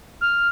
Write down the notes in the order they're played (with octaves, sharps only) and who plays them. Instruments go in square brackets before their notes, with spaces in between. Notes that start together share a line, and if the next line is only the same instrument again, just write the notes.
[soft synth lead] F6